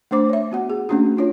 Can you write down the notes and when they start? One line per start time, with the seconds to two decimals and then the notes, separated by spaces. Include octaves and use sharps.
0.11 A3 D4 C5 D6
0.29 C#5 E5
0.52 B3 F#4 F#5
0.70 G#4
0.89 A3 A#3 C#4 D4 F#4
1.17 D4 F4 C#5